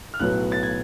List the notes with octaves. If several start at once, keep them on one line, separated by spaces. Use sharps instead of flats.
F6
B1 A2 F#3 B3 F#6
A6
G#6